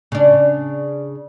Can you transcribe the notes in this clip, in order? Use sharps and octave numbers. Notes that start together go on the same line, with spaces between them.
C#3 D4